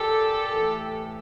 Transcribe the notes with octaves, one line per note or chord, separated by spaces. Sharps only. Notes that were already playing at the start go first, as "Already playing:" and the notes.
Already playing: A#2 G4 A4
A2 E3